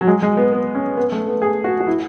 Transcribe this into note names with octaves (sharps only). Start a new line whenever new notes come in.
F#3
G#3
G#3
B3
B3
C#4
B3
A3
B3
G#4
F#4
F#4
E4